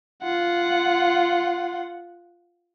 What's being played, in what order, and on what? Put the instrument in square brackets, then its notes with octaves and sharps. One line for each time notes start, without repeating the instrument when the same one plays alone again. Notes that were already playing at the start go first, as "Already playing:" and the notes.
[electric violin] F4 F#5